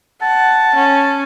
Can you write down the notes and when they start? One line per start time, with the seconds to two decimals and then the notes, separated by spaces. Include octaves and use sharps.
0.22 F#5 A5
0.75 C#4